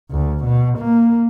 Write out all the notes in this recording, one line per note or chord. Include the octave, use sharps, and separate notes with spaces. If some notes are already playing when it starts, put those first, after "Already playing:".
D2
B2
A#3